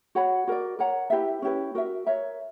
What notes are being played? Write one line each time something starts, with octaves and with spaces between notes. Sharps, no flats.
F#4 C#5 F#5 B5
F#4 A#4 D5
A#4 C#5 F#5 A#5
E4 G4 B4 E5
C#4 E4 G4 B4
F#4 A#4 E5
A#4 C#5 E5